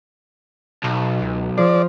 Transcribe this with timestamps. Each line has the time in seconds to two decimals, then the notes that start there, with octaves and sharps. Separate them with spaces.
0.84 B1 B2
1.22 C#2
1.58 F3 G#4 D5